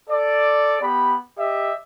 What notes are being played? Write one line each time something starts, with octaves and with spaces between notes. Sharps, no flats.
A4 D5
B3 G4 B5
G4 D#5 E5